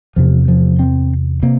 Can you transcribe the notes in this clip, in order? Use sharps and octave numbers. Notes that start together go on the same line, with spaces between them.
E2 C3 F3
F3
C4
C3 A#3